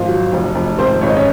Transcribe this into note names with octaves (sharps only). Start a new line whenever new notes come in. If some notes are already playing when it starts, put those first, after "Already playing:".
Already playing: G#1 F3 F4
F#3
F1
F1
G#1 C4 C5
G#1 C#5
D#5
C#4 C#5